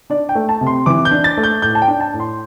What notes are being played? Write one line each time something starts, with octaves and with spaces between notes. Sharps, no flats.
D4 D5
G5
A3
A5
C3
C6
E3 D6
G6
D4
A6
A3
G6
A2 G6
A5
G5
D4
A5
A2
C6